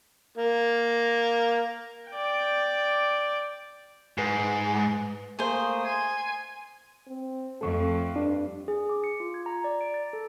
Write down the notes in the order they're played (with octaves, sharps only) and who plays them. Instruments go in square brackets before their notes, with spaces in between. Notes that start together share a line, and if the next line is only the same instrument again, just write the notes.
[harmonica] A#3
[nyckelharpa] D5 G5
[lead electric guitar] G#2 [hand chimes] B4 G#5 C7
[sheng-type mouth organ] A3 A#3 D#6 [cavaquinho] G#4 C5
[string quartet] G#5 [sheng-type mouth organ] C6
[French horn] C4
[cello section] F2 [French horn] A3 [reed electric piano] A4 C#6
[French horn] G2 [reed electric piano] D4
[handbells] G#4
D6
C#7
F4
G#6
A#5
D5
D7
A6
A4